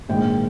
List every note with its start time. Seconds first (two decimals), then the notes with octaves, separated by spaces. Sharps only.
0.09 A#1 G#2 D#3 G#3 G5